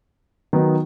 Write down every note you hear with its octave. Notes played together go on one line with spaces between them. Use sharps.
D#3 F#3 B3 D#4